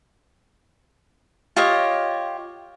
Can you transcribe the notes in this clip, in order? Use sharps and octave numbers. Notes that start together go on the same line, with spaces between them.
F4 G4 C#5 D#5